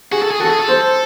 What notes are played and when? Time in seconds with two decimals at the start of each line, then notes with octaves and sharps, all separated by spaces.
0.12 F#4 G#4
0.22 A4
0.31 G#4
0.40 F#4 A4
0.50 G#4
0.60 A4
0.69 C5